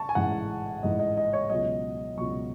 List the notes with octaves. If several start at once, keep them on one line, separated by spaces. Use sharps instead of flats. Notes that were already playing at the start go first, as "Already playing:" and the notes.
Already playing: A5 C#6
G#5
A1 G#2 E3 F#5
A1 G#2 E3 D#5
D#5
D#5
C#5
C#2 B2 F#3 D#5
C#2 B2 F#3 C#6